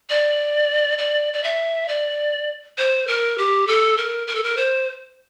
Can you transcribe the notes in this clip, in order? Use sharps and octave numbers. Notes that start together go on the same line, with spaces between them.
D5
D5
D5
E5
D5
C5
A#4
G4
A4
A#4
A#4
A4
A#4
C5